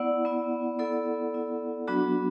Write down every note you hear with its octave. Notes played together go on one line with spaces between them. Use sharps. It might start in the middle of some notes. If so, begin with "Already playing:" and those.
Already playing: B3 E4 D5 F#5
B3 E4
B3 E4 A4 D5
B3 E4
F#3 B3 D4 F#4